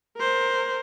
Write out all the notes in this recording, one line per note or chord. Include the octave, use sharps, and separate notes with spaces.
A#4 C5